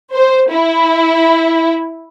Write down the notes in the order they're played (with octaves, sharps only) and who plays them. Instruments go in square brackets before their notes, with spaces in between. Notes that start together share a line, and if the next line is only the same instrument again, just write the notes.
[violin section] C5
E4